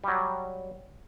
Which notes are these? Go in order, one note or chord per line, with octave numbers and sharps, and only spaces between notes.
F#3 G3